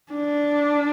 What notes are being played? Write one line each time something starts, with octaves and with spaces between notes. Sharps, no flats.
D4